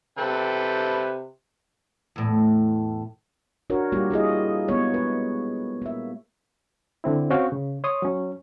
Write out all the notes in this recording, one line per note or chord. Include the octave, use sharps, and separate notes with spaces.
C3 A4 B4 G5
E2 A2
D4 F#4 A#4 C#5
G3 A#3 F4 G4
A#3 E4 G#4 D#5
G#3 B3 C#5
B4
A#3 E5
D3 C4 E4
C4 C#4 F#4 C#5 F5 G5
C#3
C#5 C6 D#6
F#3 C#4